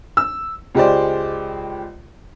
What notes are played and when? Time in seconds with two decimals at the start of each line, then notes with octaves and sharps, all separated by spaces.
0.17 E6
0.75 C#2 G#3 G4 C5 D5